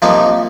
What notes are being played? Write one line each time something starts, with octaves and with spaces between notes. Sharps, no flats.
C3 F3 A#3 D#4 F5